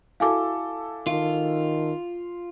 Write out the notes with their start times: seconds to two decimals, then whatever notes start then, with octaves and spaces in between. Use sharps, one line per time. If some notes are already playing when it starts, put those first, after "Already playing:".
0.20 E4 F#4 A4 F5 G#5 D6
1.07 D#3 F4